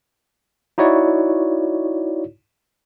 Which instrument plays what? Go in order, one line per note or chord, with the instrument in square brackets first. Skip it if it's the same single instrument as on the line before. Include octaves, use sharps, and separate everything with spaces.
[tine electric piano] D#4 E4 F#4 C#5 D5